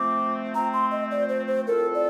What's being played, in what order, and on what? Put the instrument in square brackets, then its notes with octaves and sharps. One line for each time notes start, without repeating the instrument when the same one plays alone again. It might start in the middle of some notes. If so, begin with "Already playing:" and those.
Already playing: [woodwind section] F3 A3 C4 [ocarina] D6
[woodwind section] F3 A3 C4 [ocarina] A#5
[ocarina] C6
D#5
D5
C5
C5
[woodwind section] A2 F3 C4 F4 A4 [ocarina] A#4
[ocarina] D5